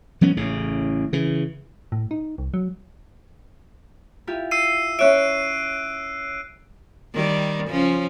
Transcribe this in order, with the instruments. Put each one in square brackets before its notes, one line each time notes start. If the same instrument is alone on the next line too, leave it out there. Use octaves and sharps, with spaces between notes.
[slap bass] F3 F#3 B3 C#4
A1 A2 C#3
C#3 E3
[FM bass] A2
D#4
C2
F#3
[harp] E4 F4 G4
[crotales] E6 C7 D#7
[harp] C#4 C#5 E5 [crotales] F#6 D7
[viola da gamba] D#3 G3
C#3 F3 C#4